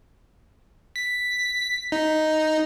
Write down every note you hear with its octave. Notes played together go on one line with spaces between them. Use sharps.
B6
D#4